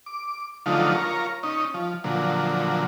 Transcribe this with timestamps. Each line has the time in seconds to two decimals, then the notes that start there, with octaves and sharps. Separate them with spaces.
0.06 D6
0.66 D3 F3 F#3 A3 D#4 F4
0.95 F4 A#4 C#5
1.43 C#4 D#4
1.74 F3
2.04 A#2 D3 F3 F#3